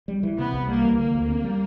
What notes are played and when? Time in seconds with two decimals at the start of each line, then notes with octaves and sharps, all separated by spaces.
0.08 G3
0.23 E3
0.38 C3 B3
0.53 C2
0.69 G3 A#3
0.84 E3
0.99 D3 A#3
1.14 D2
1.29 C4
1.44 G3